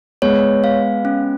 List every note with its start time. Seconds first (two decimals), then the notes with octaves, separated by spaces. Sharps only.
0.22 G#3 B3 C#5
0.64 F5
1.05 C#4